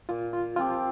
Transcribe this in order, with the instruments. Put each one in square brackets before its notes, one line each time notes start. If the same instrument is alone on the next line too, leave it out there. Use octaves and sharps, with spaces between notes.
[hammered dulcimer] A#2 [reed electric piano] F4
[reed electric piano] F4
[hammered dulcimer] F3 C4 G4 [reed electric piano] F4